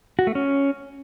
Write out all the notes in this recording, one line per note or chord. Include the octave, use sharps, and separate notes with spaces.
F#4
A3
C#4